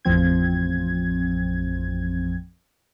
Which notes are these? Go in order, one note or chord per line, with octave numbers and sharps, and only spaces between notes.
A1 F2 F3 C4 G#6